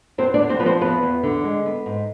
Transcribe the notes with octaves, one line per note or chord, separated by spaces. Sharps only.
E2 C4 C5
D4 D5
D3
C4 C5
F3 B4
C4 C5
E2 B3 B4
E2
D3
G#3
B3
G#2